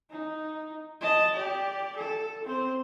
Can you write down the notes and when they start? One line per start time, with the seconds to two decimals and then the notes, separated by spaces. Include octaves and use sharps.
0.11 D#4
1.01 D#5 A5
1.33 G4 D5
1.96 A4
2.45 C4 C5